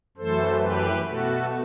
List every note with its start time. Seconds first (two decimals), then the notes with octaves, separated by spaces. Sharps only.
0.17 F#2 E3 A3 A4 C5
0.61 G4 B4
1.06 B2 A3 F#4 A4